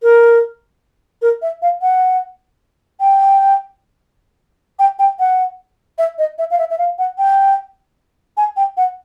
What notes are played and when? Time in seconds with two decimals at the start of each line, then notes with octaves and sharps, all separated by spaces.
0.03 A#4
1.22 A#4
1.42 E5
1.62 F5
1.82 F#5
3.00 G5
4.79 G5
4.99 G5
5.20 F#5
5.98 E5
6.18 D#5
6.38 E5
6.51 F5
6.59 E5
6.70 E5
6.78 F5
6.99 F#5
7.18 G5
8.37 G#5
8.57 G5
8.77 F#5